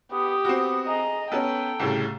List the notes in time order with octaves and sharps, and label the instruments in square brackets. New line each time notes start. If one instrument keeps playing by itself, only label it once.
[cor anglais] B3 [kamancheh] G4 [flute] D#6
[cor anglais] B3 [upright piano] C4 F#4
[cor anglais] G#4 [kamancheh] D#5 A#5
[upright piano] B3 C#4 [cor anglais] A4 [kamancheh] G5 [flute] A#5
[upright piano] C2 A2 C#3